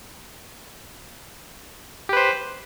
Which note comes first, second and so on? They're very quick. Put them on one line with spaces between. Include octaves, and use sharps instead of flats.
G4 B4 C5